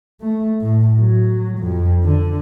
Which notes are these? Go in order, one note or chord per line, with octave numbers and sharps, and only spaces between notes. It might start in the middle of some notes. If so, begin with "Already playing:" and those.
A3
A2
F#3
F2
D3